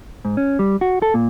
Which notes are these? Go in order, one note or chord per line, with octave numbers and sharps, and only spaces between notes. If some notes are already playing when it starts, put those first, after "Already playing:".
G#2
C#4
G3
F#4
A4
A#2